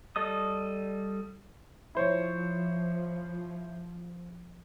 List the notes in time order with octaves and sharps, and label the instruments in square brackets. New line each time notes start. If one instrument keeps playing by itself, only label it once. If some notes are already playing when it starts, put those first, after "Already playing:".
[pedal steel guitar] G3 A4 D#5 D#6
[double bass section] F3 [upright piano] E4 C5 C#5